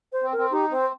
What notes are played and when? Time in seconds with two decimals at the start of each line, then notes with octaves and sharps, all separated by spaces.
0.13 C5
0.22 C4
0.32 C4 A#4
0.52 D#4 G4
0.71 C4 C5